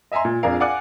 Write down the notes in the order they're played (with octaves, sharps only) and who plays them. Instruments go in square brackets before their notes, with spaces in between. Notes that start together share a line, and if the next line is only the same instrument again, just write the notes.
[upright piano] D#5 E5 G#5 A#5 C6
A#2
F2 D4 G#4 A#4 F5
D5 F5 F#5 G#5 D6 F#6